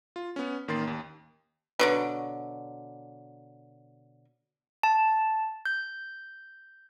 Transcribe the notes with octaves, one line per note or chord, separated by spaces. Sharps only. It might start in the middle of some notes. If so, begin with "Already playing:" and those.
F4
B3 C#4
A1 D#3 A#3 C6 A6 C7
D#2
B2 D3 F#3
A5
G6